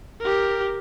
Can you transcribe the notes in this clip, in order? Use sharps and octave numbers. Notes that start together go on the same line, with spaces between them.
G4 A#4